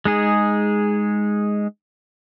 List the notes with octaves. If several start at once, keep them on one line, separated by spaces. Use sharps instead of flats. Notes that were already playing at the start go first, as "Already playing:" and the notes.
G#3 D#4 G#4